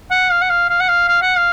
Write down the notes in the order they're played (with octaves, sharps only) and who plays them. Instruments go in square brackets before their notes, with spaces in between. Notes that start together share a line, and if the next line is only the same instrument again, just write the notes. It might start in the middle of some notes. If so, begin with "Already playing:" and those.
[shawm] F#5
F5
F#5
F5
F5
F#5
F5
F5
F#5
F5